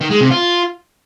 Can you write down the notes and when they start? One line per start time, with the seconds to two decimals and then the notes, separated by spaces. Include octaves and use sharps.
0.01 D#3
0.11 G#3
0.21 C3
0.31 F4